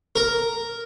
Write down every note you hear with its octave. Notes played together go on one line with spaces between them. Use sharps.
A#4